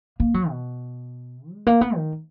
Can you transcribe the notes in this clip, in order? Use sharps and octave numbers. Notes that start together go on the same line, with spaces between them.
A#3
F#3
B2
G#3
A#3
B3
D#3